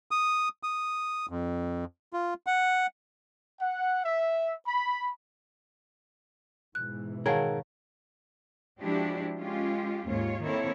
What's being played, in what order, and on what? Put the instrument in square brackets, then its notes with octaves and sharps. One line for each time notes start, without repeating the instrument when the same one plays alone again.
[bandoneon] D#6
D#6
F2
F4
F#5
[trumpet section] F#5
E5
B5
[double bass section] G#2 B2 E3 [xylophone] F#6
[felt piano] D#3 F#5 A5 [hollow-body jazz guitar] G#4 A#4 [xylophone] C#5 F5
[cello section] F3 G#3 D4 E4 F#4 G4
G#3 C#4 F4 G4
D#2 G#2 F4 C#5
D#3 A#3 C4 E4 A4 C#5